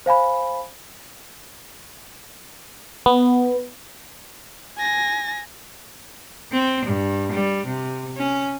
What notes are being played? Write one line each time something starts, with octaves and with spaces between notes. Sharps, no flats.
C5 F5 G#5 B5
B3
G#5 A#6
C4
G2
G3
C3
C#4